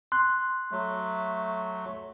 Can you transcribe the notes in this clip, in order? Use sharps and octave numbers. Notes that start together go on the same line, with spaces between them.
C6 F#6
F#3 A3